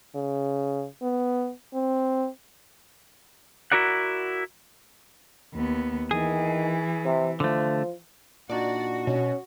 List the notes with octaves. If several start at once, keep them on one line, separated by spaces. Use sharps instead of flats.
C#3
B3
C4
E4 F#4 A#4 D5 F#5
D#2 B3
D#3 E3 G#4
C3
D3 F3 A3
A#2 D4 D#4 F#4 D5
B2 C#4